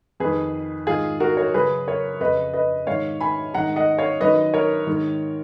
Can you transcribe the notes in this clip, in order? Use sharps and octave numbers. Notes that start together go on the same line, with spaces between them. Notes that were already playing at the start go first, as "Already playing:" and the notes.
F2 D#3 G#4 B4
G#2 D#3 F4 G#4
F#4 A#4
A#4 C#5
F#2 C#3 G#4 B4
A#4 C#5
F2 C#3 B4 D#5
B4 D#5
G#2 D#3 C#5 F5
G#5 B5
G#2 D#3 F#5 A#5
D#5 F#5
C#5 F5
F#2 D#3 B4 D#5
A#4 C#5
G#2 D#3